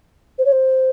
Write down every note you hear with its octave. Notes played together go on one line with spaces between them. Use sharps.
C5
C#5
C5